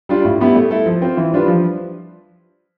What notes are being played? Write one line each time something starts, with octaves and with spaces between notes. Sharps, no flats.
G3 D4 F4
A2
G3 B3 E4
A3
E4 A4
F3
C4 F4
E3
G3 D4 F4 B4
F3